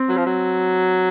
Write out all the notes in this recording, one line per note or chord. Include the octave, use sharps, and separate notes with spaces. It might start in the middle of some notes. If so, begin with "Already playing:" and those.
Already playing: C4
F#3
F3
F#3